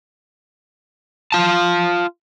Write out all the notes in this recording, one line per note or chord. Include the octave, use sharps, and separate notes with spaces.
F4 A5